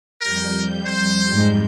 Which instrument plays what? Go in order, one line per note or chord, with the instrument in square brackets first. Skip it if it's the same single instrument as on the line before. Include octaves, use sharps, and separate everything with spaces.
[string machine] F2 G3 G6 [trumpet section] A#4
[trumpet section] C5
[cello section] G#2 G#3